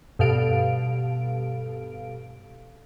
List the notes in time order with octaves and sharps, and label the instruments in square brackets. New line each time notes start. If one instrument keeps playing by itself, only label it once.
[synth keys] G2 B2 A4 F5 D7